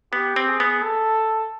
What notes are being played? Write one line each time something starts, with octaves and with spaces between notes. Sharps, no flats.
B3 G4
C4
G#4
B3
A4